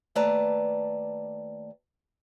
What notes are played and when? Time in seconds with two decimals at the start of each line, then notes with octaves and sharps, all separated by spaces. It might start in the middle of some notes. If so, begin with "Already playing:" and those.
0.15 D#2 A3 B4 D5 A5 A#5